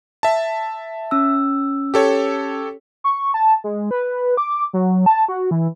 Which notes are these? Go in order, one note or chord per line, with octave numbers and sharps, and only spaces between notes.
E5 A5
C#4 E6
G4 A4 C#5
C#6
A5
G#3
B4
D6
F#3
A5
F#4
E3